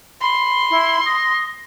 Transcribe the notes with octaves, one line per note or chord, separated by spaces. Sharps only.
B5 C6
E4
D#6 A#6